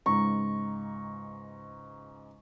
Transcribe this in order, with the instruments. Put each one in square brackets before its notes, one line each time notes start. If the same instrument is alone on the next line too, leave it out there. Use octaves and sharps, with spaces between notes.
[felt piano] C#2 G#2 A#5 [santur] C#6